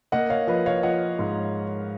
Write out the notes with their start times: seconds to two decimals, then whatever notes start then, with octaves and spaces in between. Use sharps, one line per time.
0.12 A#3 D#5 F#5
0.30 C#5 F5
0.47 F3 B4 D#5
0.66 C#5 F5
0.83 F3 D#5 F#5
1.19 G#2